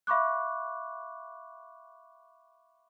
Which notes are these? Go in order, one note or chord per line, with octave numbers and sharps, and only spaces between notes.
E5 F5 B5 C#6 D6 F#6